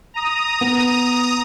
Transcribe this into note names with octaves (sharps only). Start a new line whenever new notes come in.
A#5 D#6
B3